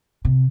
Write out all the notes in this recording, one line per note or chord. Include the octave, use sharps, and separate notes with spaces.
C3